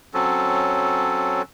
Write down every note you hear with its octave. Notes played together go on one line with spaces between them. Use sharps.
F#3 C4 C#4 A4